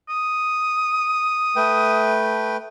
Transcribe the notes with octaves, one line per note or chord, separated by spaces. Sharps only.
D#6
A3 B4 G5